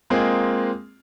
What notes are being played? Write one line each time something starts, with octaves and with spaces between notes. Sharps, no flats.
G#3 A#3 C4 F4 G#4